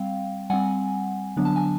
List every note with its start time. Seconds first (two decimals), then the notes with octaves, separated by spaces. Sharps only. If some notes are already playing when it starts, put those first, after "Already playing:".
Already playing: G3 C4 F5 G5
0.50 G3 C4 F#5 G#5
1.37 D3 F#3 B3 D4
1.45 A5
1.56 G#5